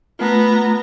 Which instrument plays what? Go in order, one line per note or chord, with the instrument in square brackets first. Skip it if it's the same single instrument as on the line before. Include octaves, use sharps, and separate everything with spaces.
[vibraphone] A3 F4 [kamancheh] B3 A#5